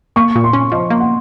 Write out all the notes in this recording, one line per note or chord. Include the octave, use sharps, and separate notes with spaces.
A#3 C#6
A#2
C6
C#4
F3 D#5
A#3
F#5